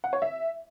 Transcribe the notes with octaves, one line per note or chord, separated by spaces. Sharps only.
F#5
C#5
E5